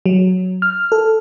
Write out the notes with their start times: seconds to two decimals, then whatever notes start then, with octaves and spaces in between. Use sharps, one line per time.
0.06 F#3
0.62 F6
0.92 A4